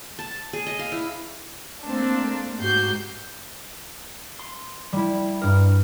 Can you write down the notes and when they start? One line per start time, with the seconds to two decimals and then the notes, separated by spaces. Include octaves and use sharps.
0.19 A5
0.53 G#4
0.67 D#5
0.79 F5
0.92 E4
1.85 A3 A#3 C4 D4
2.59 G#2 F#4 G4 G6 C7
4.39 C6
4.93 G3 E4
5.42 G2 A#4